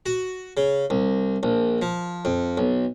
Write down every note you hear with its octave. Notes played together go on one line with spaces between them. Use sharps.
F#4
C#3
C2
A#1
F3
F2
B1